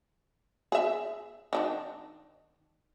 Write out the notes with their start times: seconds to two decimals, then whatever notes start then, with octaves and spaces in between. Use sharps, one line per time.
0.72 G#4 E5
1.53 D#3 D4 D#4